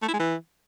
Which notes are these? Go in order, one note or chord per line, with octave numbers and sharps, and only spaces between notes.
A3
E4
G#3
E3